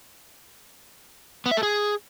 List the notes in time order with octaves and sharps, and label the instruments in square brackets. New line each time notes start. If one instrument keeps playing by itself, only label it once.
[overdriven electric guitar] B3
E5
A4
G#4